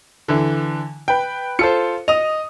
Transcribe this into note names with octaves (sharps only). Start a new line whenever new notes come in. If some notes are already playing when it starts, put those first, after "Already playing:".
D3 E3
B4 G5
F4 A4 C5 C#7
D#5 D#6 F7